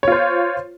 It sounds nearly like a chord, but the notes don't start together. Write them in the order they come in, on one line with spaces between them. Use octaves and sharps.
C#5 F4 C5